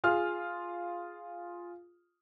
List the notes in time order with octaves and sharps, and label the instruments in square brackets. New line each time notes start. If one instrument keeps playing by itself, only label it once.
[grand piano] F4 G#4 F6